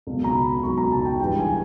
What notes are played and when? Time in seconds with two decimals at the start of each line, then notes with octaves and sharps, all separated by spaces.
0.07 C#2 B2 F#3
0.24 A#5
0.35 B5
0.63 C#2 B2 F#3 C#6
0.78 A#5
0.92 A5
1.05 G5
1.19 G2 E3 G#3 G5
1.39 G#5